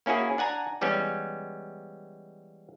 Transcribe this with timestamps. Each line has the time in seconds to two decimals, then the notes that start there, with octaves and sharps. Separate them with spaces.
0.06 A#3 C#4 E4 F#4 G#4
0.38 D4 F#5 G#5 A#5
0.81 E3 G3 G#3 B3 C#4